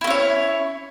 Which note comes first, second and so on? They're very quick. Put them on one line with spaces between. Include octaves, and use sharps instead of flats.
E4 A3 C#4 C#5